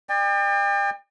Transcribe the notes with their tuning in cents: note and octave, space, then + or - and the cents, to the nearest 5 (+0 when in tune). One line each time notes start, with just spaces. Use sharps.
D5 +40 G5 +35